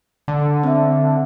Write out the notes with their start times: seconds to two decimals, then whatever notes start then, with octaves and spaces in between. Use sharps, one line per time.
0.28 D3
0.64 C4 E5